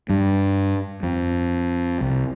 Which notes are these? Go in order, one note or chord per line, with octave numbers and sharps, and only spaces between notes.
G2
F2
C2